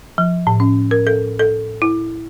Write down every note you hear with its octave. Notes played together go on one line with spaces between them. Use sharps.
F3
A2
C#4
A#4
A4
A4
E4